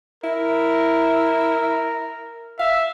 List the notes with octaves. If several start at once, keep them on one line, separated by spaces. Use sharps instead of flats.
E4 A#4
E5 F5